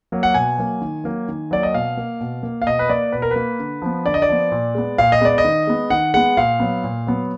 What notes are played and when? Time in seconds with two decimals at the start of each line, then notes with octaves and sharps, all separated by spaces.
0.12 F#3 A#3
0.23 F#5
0.34 B2 G#5
0.58 F#3 A#3
0.81 D#3
1.04 F#3 A#3
1.28 D#3
1.51 F#3 A#3 D5
1.63 D#5
1.74 B2 F5
1.97 A#3
2.20 B2
2.43 A#3
2.62 F5
2.66 B2 D#5
2.79 B4
2.89 A#3 D5
3.12 B2 B4
3.22 A#4
3.31 A#3 B4
3.59 D3
3.82 F3 B3
4.06 D3 D5
4.14 D#5
4.22 D5
4.28 F3 B3
4.51 A#2
4.75 G#3 B3
4.98 A#2 F5
5.12 D#5
5.21 G#3 B3 D5
5.38 D#5
5.45 D#3
5.67 G#3 B3
5.90 D#3 F#5
6.14 G#3 B3 F#5
6.37 A#2 F5
6.60 F#3 B3
6.84 A#2
7.07 F#3 B3